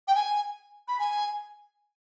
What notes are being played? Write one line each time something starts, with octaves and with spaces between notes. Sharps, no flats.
G5
G#5
B5
G#5